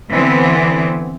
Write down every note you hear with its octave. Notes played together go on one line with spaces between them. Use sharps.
D3 E3 B3 C4